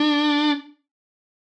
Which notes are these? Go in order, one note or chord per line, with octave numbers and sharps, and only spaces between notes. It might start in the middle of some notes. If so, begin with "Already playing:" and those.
Already playing: D4